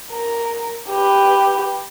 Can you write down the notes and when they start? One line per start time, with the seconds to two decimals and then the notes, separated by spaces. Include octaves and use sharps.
0.11 A#4
0.90 G4 B4